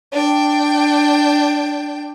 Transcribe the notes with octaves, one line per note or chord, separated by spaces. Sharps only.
D4 G5